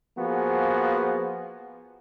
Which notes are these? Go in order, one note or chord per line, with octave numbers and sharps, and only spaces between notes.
F3 A#3 B3 F#4 G#4